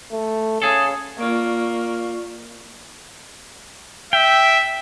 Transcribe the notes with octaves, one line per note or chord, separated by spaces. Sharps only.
A3
C#3 G#4 A4
A#3 F4 D5 C#6
E5 G5